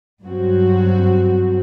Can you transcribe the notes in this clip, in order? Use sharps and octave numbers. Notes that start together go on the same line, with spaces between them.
G2 F#3 C4 F#4